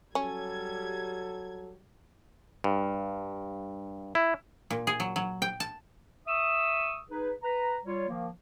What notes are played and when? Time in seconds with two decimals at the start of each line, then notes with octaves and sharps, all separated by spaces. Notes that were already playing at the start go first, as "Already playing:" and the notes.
0.15 F#3 G3 C#4 A4 G#6
2.64 G2
4.15 E4
4.70 A#2
4.87 G#4
5.00 F#3
5.16 F#3
5.42 G5
5.60 A5
6.27 E5 C#6 D#6 E6
7.11 D#4 G#4 B4
7.43 B4 A#5
7.86 G3 F4 C#5
8.09 D#3 F3 A#3